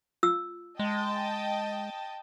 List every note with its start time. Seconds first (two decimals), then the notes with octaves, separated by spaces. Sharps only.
0.23 F4 E6
0.79 G#3 D#5 G5 A5